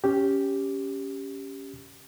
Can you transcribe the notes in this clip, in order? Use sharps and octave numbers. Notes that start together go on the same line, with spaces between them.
C#4 G4